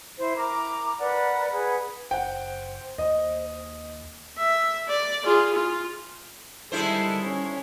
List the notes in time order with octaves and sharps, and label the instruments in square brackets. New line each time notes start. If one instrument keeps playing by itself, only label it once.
[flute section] E4 C5
E4 A#4 A#5 D6
A#4 B4 D5 F#5
G#4 B4 F#5
[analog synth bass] F#1 [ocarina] C5 [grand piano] F#5 G5
[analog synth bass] D#2 [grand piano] D#5
[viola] E5
D5
F4 G#4
F4
[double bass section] D3 D#3 G3 [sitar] G#3 E4 C5 [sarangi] A4
[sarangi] C#4